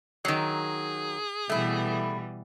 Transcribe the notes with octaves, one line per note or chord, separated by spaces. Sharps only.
D#3 F#3 G#4
B2 E3 G3 A3 E4